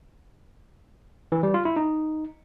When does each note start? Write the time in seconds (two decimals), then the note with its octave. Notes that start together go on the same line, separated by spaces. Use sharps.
1.32 E3
1.43 G3
1.54 F4
1.65 E4
1.76 D#4